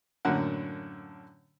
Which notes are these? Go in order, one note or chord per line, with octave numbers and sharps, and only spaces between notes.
F#2 A2 D3 A#3 F#5